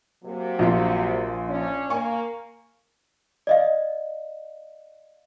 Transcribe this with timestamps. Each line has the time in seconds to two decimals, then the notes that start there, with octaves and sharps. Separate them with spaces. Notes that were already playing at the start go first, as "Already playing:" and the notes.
0.24 C3 F#3 A#3
0.59 A#1 F3 F4
1.49 C#4 D4
1.90 A#3 G#5 C#6
3.47 D5 D#5 F5